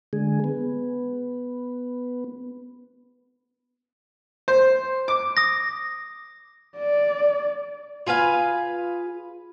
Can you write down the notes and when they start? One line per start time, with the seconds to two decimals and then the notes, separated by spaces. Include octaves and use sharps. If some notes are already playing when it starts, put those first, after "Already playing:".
0.13 D3 G#3 G#4
0.44 B3
4.48 C5
5.08 D6
5.37 D#6 A#6
6.78 D5
8.07 F4 G#4 B4 F5